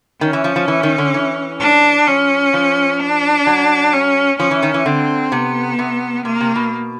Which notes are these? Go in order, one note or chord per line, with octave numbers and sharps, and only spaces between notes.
D#3 C#4
E3
F3
F3
E3
D#3
D3
E3
D4
F3 C#4
F3
D4
F#3
C#4
F3 C#4
E3
D#3
E3
D3 C4
C3 B3
C3
C3 A#3
C3
B2